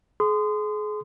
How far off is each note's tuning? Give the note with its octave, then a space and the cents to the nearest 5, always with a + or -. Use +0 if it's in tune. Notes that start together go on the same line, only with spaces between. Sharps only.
G#4 +35 C6 -30 D#6 -25